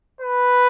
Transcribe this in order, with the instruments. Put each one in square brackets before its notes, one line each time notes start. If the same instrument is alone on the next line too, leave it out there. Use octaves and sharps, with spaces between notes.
[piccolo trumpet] B4